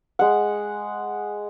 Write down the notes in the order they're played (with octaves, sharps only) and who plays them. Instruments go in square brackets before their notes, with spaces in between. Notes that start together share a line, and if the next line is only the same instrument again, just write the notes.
[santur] G#3 F#5